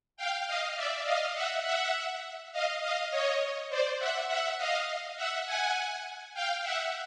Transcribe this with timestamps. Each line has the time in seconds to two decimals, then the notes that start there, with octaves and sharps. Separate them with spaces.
0.17 F5 G5
0.46 D#5 F5
0.76 D5 E5
1.05 D#5 F5
1.34 E5 F#5
1.63 E5 F#5
2.52 D#5 F5
2.81 D#5 F5
3.11 C#5 D#5
3.69 C5 D5
3.99 E5 F#5
4.28 E5 F#5
4.58 D#5 F5
5.16 E5 F#5
5.46 F#5 G#5
6.34 F5 G5
6.63 E5 F#5